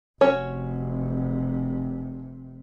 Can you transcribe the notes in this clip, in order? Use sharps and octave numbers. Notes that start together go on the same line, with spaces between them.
F1 C3 C#4 F#4 C#5